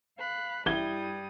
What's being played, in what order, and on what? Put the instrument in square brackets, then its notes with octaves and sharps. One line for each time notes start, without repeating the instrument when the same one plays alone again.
[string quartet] F5 B5 F#6
[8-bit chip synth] A1 [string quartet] G2 G3 D#6 [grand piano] E4 G#6 G7